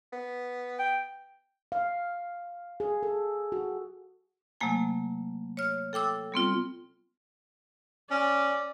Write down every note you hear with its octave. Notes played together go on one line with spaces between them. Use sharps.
B3
G5
F5
G#4
A4
F#4
C3 F#3 A3 A#3 G#5
C#5 F6
A4 G5 D6 E6
G3 B3 C4 F4
C#4 D5